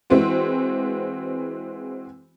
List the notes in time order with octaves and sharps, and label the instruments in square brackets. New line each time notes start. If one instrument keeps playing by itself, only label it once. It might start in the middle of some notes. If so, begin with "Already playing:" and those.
[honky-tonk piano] E3 G#3 C4 F#4